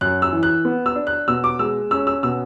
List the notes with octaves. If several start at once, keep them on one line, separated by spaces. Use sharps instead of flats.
F#2 F#6
E6
E3
F#6
B3
E6
D4
F#6
B2 E6
D6
G#3 E6
C#4 E6
E6
B2 E6